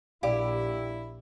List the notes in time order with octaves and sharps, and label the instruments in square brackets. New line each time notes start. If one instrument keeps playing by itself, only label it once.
[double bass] A#1 [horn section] E4 [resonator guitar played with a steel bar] G4 [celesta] D5 F5